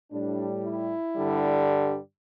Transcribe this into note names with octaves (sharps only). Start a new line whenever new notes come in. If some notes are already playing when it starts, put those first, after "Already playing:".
A2 G3 D4
E4
G2 D3 G3